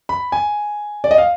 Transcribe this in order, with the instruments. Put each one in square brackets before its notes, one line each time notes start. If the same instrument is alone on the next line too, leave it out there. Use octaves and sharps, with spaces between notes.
[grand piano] B5
G#5
D5
D#5
F5